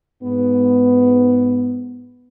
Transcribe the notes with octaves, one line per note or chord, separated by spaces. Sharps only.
G#2 B3